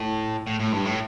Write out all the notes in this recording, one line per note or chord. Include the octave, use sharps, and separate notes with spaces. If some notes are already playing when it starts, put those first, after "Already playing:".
Already playing: A2
A2
A2
G2
A2